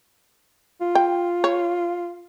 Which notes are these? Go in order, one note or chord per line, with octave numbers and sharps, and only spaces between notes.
F4
G5
C#5